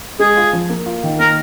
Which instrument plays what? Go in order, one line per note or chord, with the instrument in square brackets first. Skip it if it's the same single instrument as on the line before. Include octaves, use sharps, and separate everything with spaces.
[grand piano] G#3 [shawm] G#4
[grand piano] F4
F3
A#3
F4
D#3
[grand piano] A#3 [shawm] A#4